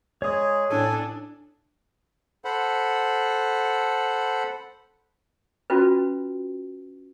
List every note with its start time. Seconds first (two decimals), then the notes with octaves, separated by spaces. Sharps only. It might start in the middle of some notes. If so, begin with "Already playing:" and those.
0.22 G#3 G#4 C#5 D#6
0.70 A2 D4 A4 G#5
2.45 A4 C5 F#5 B5
5.70 C#4 F4 F#4 B4